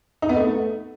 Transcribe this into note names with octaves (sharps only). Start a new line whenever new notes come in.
D#4
B3
A3